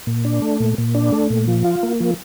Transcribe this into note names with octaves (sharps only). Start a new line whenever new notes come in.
A#2
D4
A3
A#2
A#2
D4
A3
A#2
F3
F4
A#3
F3